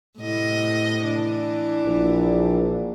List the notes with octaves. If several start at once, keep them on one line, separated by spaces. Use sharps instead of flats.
A2 C3 D#5
E3 D4
A#1